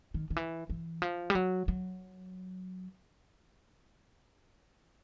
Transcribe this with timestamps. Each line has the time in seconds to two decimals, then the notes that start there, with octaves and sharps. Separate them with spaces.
0.14 D#3
0.30 D#3
0.36 E3
0.69 E3
1.02 F3
1.30 G3
1.35 F#3
1.68 F#3